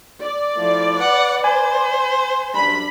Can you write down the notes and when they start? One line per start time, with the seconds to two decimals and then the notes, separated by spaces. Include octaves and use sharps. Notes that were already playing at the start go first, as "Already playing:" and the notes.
0.20 D5
0.56 F3 A3 E4
0.98 B4 F#5
1.44 C5 G#5
2.54 F#2 G3 D4 B5